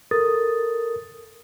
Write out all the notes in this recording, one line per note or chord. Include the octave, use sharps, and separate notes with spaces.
A4 A#4 D#6 A6